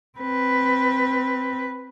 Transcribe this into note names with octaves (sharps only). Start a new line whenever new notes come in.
C4 B4